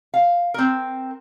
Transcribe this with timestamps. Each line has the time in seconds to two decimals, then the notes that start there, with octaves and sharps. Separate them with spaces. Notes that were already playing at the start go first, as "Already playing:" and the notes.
0.14 F5
0.54 C4 A#4